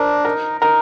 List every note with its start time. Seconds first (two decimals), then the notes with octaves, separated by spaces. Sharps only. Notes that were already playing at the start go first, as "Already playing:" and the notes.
Already playing: D4 A#4 C5
0.25 D#4 A#4
0.61 D#4 A#4